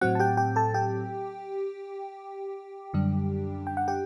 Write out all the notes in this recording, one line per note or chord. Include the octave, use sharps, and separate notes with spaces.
A2 F#3 C4 F#4 F#5
A5
G4 G5
G4 G5
A4 A5
G4 G5
F#2 D3 G3 D4
G5
F#5
G4 G5